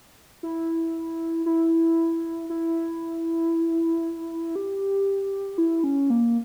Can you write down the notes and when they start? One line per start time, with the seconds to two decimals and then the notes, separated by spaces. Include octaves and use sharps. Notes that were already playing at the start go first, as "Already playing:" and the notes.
0.43 E4
1.46 E4
2.50 E4
4.56 G4
5.58 E4
5.84 C#4
6.10 A#3